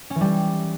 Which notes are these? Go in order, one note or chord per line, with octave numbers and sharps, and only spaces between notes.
C#4
E3
G3